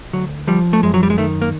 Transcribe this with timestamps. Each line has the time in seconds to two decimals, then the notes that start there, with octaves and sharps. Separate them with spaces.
0.13 D2 F#3
0.47 F3 G3
0.73 A3
0.83 F#2 G#3
0.94 F#3
1.03 G3
1.10 G#3
1.18 D#3 A3
1.42 A#3